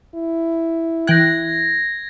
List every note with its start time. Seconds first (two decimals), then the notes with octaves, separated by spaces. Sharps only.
0.15 E4
1.07 E3 G5 F#6 G#6 A#6